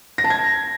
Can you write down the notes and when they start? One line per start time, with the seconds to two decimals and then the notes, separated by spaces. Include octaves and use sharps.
0.18 A#6
0.24 A5
0.30 G#6